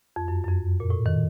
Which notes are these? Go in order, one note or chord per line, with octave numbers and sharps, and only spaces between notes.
F2
F#2
F#2
F2
A#2
A2
D#3